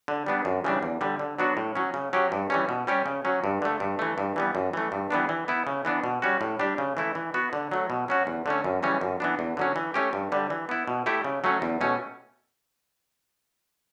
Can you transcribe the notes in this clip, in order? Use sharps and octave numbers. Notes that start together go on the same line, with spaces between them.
D3
G3 B3 D4
F#2
C#3 E3 G3 D4
E2
D3 G3
D3
F#3 B3 D4 F#4
A2
F#3 C#4
C#3
F#3 C#4 G4
G2
E3 G3 C#4
B2
G3 C#4 G4
C#3
F#3 C#4
G2
D3 A3
G2
E3 A3
G2
E3 G3 B3
F#2
E3 A3
G2
E3 G3 B3 D4
E3
B3 E4
C#3
E3 B3 D4
B2
G3 C#4 F#4
A2
G3 D4 G4
C#3
E3 A3 E4
E3
B3 F#4
D3
F#3 A3
B2
F#3 C#4 F#4
E2
D3 A3 C#4
F#2
C#3 E3 G3 C#4
F#2
E3 B3 D4
E2
D3 F#3 C#4
E3
A3 C#4 G4
G2
D3 G3
E3
B3 E4
B2
A3 E4 G4
C#3
F#3 A3 C#4
E2
B2 A3 C#4